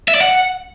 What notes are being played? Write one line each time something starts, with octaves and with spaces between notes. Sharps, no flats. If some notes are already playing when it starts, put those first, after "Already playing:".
E5
D5
F#5